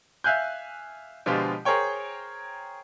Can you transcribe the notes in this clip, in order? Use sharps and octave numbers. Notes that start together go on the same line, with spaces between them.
E5 F5 G#5 F#6 G6
B2 D3 F3 G#3 F4 G4
G#4 A#4 C5 C#5 G5